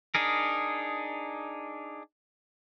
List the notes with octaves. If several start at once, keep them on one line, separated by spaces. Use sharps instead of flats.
D4 D#4 G#4 A#4